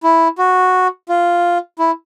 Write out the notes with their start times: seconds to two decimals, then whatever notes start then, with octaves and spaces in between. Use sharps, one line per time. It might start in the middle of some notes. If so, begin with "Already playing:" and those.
0.03 E4
0.38 F#4
1.09 F4
1.79 E4